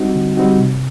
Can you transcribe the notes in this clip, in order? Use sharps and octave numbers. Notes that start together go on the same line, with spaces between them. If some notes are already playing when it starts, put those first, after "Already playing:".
Already playing: G3 C4 D#4 F#4
D3
G3 C4 D#4 F#4
C3